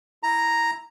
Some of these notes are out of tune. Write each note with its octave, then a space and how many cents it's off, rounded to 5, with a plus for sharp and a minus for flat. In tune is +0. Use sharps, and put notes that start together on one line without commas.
E4 +0 A#5 +0